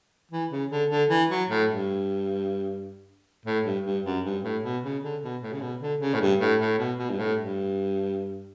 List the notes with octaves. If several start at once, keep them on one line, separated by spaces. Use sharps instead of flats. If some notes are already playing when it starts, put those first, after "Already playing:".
E3
C#3
D3
D3
E3
F#3
A2
G2
A2
G2
G2
F#2
G2
A2
B2
C#3
D3
B2
A2
C#3
B2
D3
C#3
A2
G2
A2
A2
B2
B2
G2
A2
G2